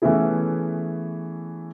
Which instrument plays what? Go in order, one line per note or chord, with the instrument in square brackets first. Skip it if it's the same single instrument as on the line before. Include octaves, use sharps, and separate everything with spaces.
[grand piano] E3 A3 B3 C#4 E4 G#4